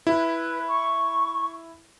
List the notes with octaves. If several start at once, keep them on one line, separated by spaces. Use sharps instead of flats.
E4 B4
C#6